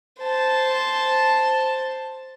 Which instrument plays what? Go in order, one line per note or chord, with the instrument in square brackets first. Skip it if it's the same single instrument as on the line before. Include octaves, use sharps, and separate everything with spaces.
[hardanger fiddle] C5 A5